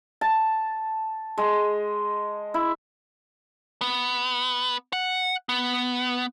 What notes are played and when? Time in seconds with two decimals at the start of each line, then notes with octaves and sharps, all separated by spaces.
0.21 A5
1.38 G#3
2.54 E4
3.81 B3
4.93 F#5
5.49 B3